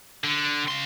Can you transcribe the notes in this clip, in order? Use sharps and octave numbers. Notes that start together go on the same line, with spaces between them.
D3
C#3 C6